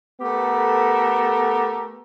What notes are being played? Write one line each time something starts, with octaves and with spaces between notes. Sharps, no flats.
A3 B3 G4 A4 A#4